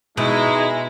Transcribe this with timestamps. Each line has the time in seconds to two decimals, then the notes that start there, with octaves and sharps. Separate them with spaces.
0.17 B2 G#3 D#4 E4